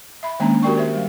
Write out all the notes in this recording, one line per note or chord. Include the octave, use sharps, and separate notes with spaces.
E5 B5
D#3 G#3 A#3 C#4 D4 A#5
F#4 G4 A#4 D5 G5 C#6
C5 E5
G3 F5